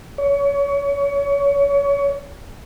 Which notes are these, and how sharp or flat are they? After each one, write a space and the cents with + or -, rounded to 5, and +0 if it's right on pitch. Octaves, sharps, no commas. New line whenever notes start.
C#5 +30